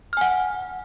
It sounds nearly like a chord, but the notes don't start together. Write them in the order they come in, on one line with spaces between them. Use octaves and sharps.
F6 G#5 F#5